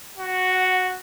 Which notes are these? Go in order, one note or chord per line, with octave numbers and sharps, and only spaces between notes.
F#4
F#5